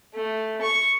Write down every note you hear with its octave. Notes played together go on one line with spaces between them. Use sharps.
A3
C#6